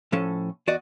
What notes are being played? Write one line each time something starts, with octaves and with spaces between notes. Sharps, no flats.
A2 F3 C#4 A4
E2 F#4 D5 D#5